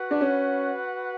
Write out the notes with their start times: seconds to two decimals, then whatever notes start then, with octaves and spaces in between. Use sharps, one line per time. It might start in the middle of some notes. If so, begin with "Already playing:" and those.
Already playing: F#4 B4 F#5
0.11 D4
0.21 C#4